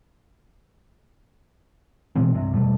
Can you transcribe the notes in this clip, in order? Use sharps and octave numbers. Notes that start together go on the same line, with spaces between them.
B2 E3 G#3 C4
C2 G2 C3
E2 B2 G3 A3